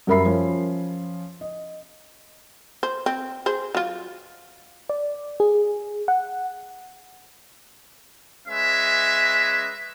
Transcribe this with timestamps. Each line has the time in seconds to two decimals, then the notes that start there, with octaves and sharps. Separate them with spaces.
0.07 F#2 G3 A#4 E5 B5 C7
0.25 F3 C#4
1.41 D#5
2.83 C5
3.06 C4
3.46 G#4 C5
3.75 F#3 F4
4.89 D5
5.40 G#4
6.08 F#5
8.47 G#3 C#4 B4 E5